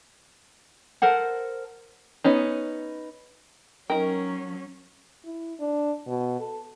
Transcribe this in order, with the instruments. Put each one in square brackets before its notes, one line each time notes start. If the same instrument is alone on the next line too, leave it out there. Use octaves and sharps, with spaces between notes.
[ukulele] A4 A#4 C5 F#5
[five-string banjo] B3 C#4 D#4
[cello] F#3 C#4 [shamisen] D#4 G5 [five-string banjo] A#4
[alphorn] E4
D4
B2
A4